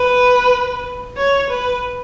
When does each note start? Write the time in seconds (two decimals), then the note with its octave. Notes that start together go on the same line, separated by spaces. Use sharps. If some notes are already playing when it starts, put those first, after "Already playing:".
Already playing: B4
1.17 C#5
1.50 B4